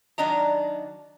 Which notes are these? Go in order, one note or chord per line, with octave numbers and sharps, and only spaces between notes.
D#3 F#3 D4 D#5 A#5